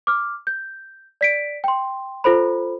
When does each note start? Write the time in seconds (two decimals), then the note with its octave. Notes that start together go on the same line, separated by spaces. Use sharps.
0.07 D6 F6
0.47 G6
1.21 D5 B6 D7
1.64 G5 C6
2.24 F4 A4 C5 B5